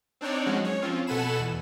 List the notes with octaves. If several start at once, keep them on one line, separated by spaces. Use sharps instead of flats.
C4 D4 D#4 C#5 D5
F3 F#3 G#3 C#4 F#4
C#5
F3 C4 C#4 F4
B2 A4 F#5 G#5 B5 E7
E2